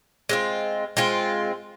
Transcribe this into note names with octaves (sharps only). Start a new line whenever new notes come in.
G#3 C4 F4
G#3 C4 F4